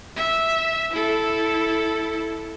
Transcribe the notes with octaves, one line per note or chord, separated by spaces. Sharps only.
E5
E4 A4